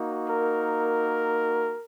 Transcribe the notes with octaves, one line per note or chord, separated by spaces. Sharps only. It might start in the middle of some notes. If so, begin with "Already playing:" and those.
Already playing: A#3 D#4 F#4
A#4